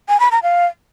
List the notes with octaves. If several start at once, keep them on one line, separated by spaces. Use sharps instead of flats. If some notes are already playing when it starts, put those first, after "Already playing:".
G#5
B5
A#5
F5